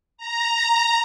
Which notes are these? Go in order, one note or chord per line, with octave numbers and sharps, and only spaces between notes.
A#5